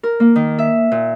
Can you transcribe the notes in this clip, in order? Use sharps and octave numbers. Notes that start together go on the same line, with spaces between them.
A#4
A#3
D#3
E5
A#2